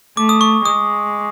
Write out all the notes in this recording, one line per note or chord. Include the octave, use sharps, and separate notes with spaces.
A3 D6
D#6
C#6
G#3 D#6